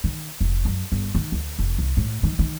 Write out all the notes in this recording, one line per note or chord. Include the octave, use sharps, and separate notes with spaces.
D#3
F1
F#2
G1
D#3
D2
F1
C2
A2
D#3
D#3